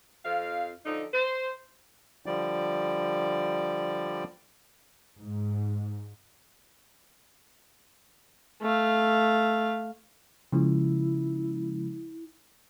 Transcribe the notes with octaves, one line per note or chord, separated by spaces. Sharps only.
F2 F5
D3 F3 D#4
C5
D3 F3 G3 D5
G#2
A3 F5
C#3 F3 G#3 E4